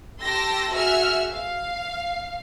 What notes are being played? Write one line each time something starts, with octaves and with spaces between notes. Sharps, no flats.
G4 A5 C6 E6 A#6
F#4 G#4 E5 E6 F6
F5